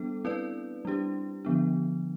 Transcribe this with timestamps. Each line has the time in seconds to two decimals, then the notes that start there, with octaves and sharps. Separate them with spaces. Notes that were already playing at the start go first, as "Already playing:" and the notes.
Already playing: G3 B3 D4 A4
0.25 C4 E4 B4 D5
0.85 G3 D4 G4
1.45 D3 F3 B3 D4